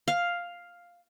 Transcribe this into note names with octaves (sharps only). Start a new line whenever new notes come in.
F5